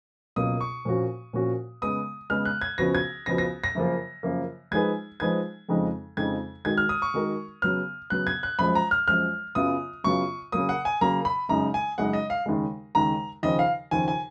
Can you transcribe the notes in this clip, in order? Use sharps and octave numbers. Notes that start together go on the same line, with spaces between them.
C#2 B2 F#3 A#3 F4 D#6
C#6
A#2 F3 A#3 C#4 F#4
A#2 F3 A#3 C#4 F#4
C#3 G#3 B3 D#6
C#3 G#3 B3 F6
F#6
G#6
C#2 C#3 F3 B3 F#4 A#6
G#6
C#2 C#3 F3 B3 F#4 A#6
A#6
A#6
F#2 C#3 F3 A#3
F#2 C#3 F3 A#3
F3 G#3 D#4 G#4 B4 G#6
F3 G#3 D#4 G#4 B4 G#6
F2 C#3 F3 G#3 D#4
F2 C#3 F3 G#3 D#4 G#6
D#3 G#3 D#4 F#4 A#4 G#6
F6
D#6
C#6
D#3 G#3 D#4 F#4 A#4
C#3 F#3 B3 F6
C#3 F#3 B3 F#6
G#6
F#6
F#2 F3 G#3 B5
A#5
F6
F#2 F3 G#3 F6
F#2 C#3 F#3 B3 F4 D#6
F#2 C#3 F#3 B3 F4 C#6
C#3 F#3 A#3 D#6
F#5
G#5
C#3 F#3 A#3 A#5
B5
F#2 C#3 G#3 D#4 A#5
G#5
F#2 C#3 G#3 D#4 F#5
D#5
F5
D#2 C#3 G#3
D#2 C#3 G#3 A#5
D#2 C#3 F3 D#5
F5
D#2 C#3 F3 G#5
G#5